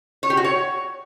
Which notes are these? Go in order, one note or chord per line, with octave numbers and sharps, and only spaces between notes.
C#5
G4
F#4
C#5